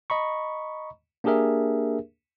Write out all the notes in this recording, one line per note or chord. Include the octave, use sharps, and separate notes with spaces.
D#5 A#5 B5 C#6
A#3 D4 G4 G#4 A#4 E5